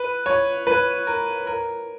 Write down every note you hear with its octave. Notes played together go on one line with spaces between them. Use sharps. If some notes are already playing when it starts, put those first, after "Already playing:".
Already playing: B4
C#5
B4
A#4
A#4